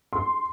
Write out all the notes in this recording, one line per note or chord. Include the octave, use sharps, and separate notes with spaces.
C6